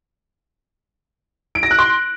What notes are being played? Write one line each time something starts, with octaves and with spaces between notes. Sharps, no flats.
D7
A#6
F#6
C6